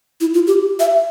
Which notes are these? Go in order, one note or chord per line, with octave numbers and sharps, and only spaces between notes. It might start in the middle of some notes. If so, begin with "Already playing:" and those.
E4
F4
G4
E5